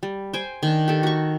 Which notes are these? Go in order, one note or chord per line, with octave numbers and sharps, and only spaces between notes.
G3
C5 G5 G#5
D#3 D4
G4 A4
F#4 C#6